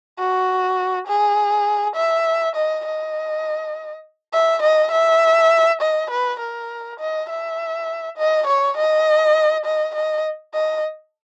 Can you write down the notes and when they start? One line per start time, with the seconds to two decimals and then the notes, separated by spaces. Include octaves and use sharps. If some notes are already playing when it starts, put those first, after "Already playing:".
0.19 F#4
1.07 G#4
1.96 E5
2.56 D#5
2.86 D#5
4.33 E5
4.63 D#5
4.92 E5
5.81 D#5
6.11 B4
6.40 A#4
7.00 D#5
7.29 E5
8.18 D#5
8.47 C#5
8.77 D#5
9.65 D#5
9.95 D#5
10.54 D#5